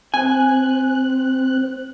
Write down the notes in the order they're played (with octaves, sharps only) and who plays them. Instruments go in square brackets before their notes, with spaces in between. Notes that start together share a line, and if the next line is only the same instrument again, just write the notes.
[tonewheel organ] C4 F#6 [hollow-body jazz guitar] G#5